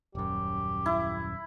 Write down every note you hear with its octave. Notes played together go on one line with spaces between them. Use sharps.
D#1 F#2 G4
E4